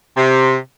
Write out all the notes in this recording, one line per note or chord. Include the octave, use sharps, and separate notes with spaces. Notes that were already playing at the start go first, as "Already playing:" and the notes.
C3